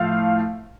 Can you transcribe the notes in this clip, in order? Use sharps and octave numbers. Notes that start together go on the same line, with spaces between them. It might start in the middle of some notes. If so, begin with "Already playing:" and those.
Already playing: A2 F3 A3 F5